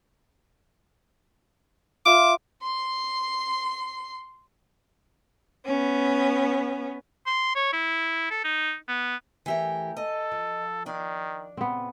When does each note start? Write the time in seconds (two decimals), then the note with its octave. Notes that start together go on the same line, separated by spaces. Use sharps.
2.06 F4 E5 D6
2.63 C6 C7
5.66 B3 C#4
7.26 C6
7.55 C#5
7.73 E4
8.30 A4
8.44 D#4
8.88 B3
9.46 E3 A3 G4 A#4 E5
9.97 A4 D#5
10.32 F3
10.86 D#3 D4
11.57 A#2 C#3 B3 C4